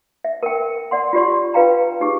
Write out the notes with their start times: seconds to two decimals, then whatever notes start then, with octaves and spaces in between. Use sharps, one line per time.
0.25 E5
0.43 A#4 G5
0.91 D5 F#5 C6
1.13 F4 G4 D5 C6
1.54 F4 B4 F5 G5 A#5
2.00 D#4 G4 G#4